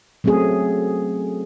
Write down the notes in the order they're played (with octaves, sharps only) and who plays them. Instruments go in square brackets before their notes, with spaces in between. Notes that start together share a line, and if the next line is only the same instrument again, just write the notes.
[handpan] F#3 A3 C4 C#4 G#4